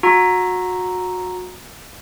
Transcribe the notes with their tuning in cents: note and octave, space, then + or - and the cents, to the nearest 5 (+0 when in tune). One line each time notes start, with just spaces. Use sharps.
F#4 -25 A#5 +0 E6 +0